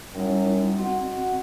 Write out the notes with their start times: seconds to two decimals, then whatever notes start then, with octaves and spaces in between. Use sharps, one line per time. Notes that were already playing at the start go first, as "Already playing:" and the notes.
0.15 F#2 G3 D#4 E4
0.78 C4 F#4 D#5